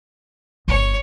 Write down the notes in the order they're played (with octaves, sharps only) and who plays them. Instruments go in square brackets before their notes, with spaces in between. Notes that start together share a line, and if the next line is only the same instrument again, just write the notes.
[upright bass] G1 [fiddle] C#5